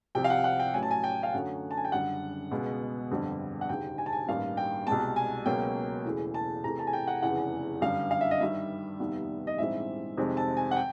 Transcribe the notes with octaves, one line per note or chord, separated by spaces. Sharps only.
C2 C3 F3 G5
F5
F#5
F#5
G5
A1 A2 F#3 G#5
A5
G#5
G5
F5
F#2 D3 F#3 A3 F#5
A5
G#5
G5
F#1 F#2 D3 G3 F#5
C#2 B2 G#3 B3
G1 F2 D3 G3
F#5
E1 D#2 C#3 G5
G#5
A5
G#5
A1 G2 D#3 G3 A#3 F5
G5
C2 B2 G#3 B3 A5
G#5
C#2 B2 F#3 A#3 G5
E1 E2 C#3 E3 A3
A5
E2 C3 E3 A3 A#5
A5
G#5
G5
F#5
F1 E2 C#3 E3 F#5
G1 F#2 D3 G3 F5
F5
E5
D#5
G2 D#3 G3 E5
F1 D#2 D#3 G3 B3
D#5
A#1 G#2 E3 G3 C4 E5
F2 C3 D#3 G#3 C4
A5
G#5
F#5
G5